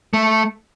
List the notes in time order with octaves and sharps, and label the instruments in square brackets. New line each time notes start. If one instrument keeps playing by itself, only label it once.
[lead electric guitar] A3